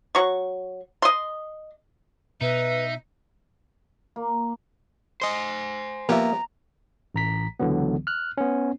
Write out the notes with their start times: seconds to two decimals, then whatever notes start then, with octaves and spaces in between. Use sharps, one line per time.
0.15 F#3 C#6
1.02 D#5 C6
2.41 B2 D#4 B4 E5
4.16 A#3
5.22 C5 D#5 G#5 C6
6.09 F3 A#3 B3 G4 E5 A#5
7.15 A1 A#5 B6
7.60 C#2 D3 E3 F#3 B3
8.07 F6 F#6
8.38 B3 C#4